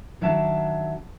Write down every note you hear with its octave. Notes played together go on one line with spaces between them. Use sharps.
D#3 F#3 D4 E5 A5